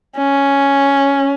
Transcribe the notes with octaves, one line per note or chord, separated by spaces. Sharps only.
C#4